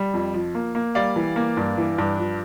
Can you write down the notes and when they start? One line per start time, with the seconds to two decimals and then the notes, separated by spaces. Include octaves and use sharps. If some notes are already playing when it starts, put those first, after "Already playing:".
Already playing: G3
0.13 F2
0.34 F3
0.55 A#3
0.75 A#3
0.95 G3 D5 F5
1.16 E3
1.36 A#3
1.57 G2
1.77 E3
1.98 G2
2.18 F3